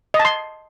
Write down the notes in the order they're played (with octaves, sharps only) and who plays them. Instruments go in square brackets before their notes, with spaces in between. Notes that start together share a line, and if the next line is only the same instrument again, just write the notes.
[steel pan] D#5
A5
C6